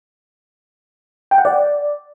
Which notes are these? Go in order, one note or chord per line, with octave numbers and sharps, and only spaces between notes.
G5
F#5
D5